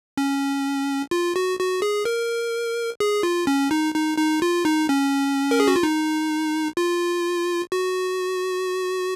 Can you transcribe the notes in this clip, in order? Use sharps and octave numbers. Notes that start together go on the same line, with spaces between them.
C#4
F4
F#4
F#4
G#4
A#4
G#4
F4
C#4
D#4
D#4
D#4
F4
D#4
C#4
A#4
G#4
F#4
F4
D#4
F4
F#4